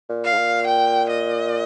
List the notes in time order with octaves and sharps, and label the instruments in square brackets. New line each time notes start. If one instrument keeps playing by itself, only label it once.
[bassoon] A#2
[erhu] F5
[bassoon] G#2
A#2
[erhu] G5
D#5